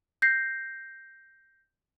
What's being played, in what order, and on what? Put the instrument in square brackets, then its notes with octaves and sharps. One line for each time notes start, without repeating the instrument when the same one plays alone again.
[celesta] G6 A#6 C7